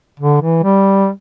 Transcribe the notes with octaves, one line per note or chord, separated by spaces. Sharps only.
D3
E3
G3